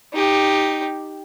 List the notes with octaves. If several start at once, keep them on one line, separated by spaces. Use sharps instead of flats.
D#4 G4